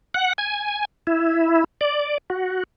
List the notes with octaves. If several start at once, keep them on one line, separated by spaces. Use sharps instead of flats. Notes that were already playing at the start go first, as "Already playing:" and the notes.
F#5
G#5
E4
D5
F#4